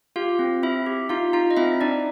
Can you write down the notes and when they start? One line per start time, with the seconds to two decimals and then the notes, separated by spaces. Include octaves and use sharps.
0.16 F4 G4 F5
0.39 C4
0.63 C4 E4 E5
0.86 G4
1.09 D#4 F4 F5
1.33 D#4 F4 F5
1.51 D#5
1.57 C4 E4 E5
1.81 D4 D#4 D5